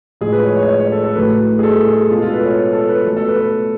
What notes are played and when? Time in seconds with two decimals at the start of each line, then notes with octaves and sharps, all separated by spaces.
0.21 A2 F3 G#3 G#4
0.33 B4
0.45 C#5
0.57 C#5
0.68 C#5
0.80 C#5
0.92 A4
1.04 A4
1.15 A2 F#3 A3 B4
1.59 G#4
1.63 A4
1.87 G#4
2.10 B2 F4
2.15 G#3
2.22 F4
2.29 A4
2.34 B4
2.45 C#5
2.73 A4
2.89 B4
3.05 B2 F#3 A3
3.17 A4
3.28 B4
3.40 B4